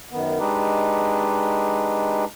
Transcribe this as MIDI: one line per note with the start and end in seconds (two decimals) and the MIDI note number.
0.11 0.39 42
0.11 0.39 51
0.11 0.39 59
0.39 2.25 56
0.39 2.25 62
0.39 2.25 63
0.39 2.25 67
0.39 2.25 71